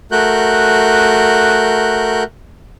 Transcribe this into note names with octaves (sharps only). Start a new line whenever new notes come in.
A3 F#4 A#4 F#6 G6